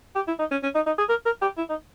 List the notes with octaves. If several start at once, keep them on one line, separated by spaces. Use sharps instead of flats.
G4
E4
D#4
C#4
C#4
D#4
D#4
G#4
A#4
A#4
G4
E4
D#4